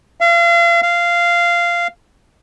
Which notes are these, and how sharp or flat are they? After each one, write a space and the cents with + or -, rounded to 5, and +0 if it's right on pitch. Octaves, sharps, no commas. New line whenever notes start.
F5 -35
F5 -10